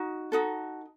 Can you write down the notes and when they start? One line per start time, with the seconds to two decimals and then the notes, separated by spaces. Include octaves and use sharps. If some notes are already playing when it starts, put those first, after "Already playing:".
Already playing: D#4 F#4
0.32 D#4 F#4 A4